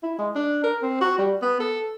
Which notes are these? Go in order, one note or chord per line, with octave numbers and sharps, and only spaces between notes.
E4
G#3
D4
A#4
C4
F#4
G3
B3
A4